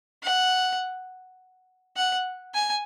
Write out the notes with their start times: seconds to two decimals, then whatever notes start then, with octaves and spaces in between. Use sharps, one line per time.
0.23 F#5
1.97 F#5
2.54 G#5